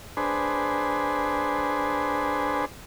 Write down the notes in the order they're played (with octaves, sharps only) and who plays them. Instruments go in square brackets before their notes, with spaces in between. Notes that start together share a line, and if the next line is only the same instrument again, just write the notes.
[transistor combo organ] D4 G#4 B4 C5